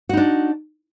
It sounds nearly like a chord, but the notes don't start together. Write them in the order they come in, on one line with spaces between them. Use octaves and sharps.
F#4 D#4 D4